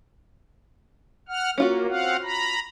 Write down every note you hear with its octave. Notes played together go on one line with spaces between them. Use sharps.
F#5 F6
A#3 C#4 F4 F#4
C4 F5 F#5
A#5 B5